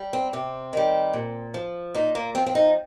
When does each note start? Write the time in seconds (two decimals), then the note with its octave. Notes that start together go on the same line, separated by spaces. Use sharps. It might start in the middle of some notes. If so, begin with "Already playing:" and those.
Already playing: G3
0.13 C4
0.33 C3 C4
0.73 D#3 G3
1.13 A#2
1.54 F3
1.94 A#2 D#4
2.15 A#3
2.35 F3 C4
2.46 C4
2.55 D#4